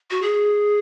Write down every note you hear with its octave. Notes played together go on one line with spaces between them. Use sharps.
F#4
G#4